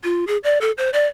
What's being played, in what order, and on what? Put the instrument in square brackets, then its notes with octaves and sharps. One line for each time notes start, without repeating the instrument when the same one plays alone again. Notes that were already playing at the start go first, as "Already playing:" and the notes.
[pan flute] F4
G#4
D5
A4
C5
D5